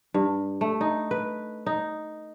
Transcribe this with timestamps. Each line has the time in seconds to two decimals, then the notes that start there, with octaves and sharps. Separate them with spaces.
0.14 G2
0.61 A3
0.81 D#4
1.11 B4
1.66 D#4